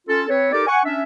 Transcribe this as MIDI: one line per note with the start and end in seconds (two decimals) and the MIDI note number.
0.07 0.23 61
0.07 0.23 65
0.07 0.23 69
0.28 0.50 60
0.28 0.50 71
0.28 0.50 73
0.52 0.67 63
0.52 0.67 67
0.52 0.67 69
0.52 0.67 70
0.52 0.67 74
0.67 0.80 78
0.67 0.80 80
0.67 0.80 85
0.85 1.03 61
0.85 1.03 62
0.85 1.03 76